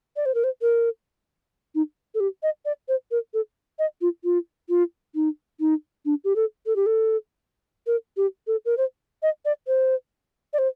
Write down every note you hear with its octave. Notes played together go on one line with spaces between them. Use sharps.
D5
C5
A#4
C5
A#4
D#4
A4
G4
D#5
D5
C5
A#4
A4
D#5
F4
F4
F4
D#4
D#4
D4
G4
A4
A4
G4
A4
A#4
G4
A4
A#4
C5
D#5
D5
C5
D5
C5